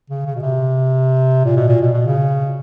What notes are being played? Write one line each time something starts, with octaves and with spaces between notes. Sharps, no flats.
C#3
C#3
B2
C3
A#2
B2
A#2
B2
B2
C#3